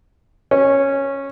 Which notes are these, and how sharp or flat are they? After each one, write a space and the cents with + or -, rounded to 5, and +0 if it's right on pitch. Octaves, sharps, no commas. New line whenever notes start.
C#4 -10